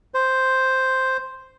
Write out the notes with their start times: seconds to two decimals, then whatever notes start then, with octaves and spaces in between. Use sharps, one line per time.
0.14 C5